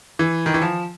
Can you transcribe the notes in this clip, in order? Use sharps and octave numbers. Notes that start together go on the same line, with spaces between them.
E3
D#3
E3
F3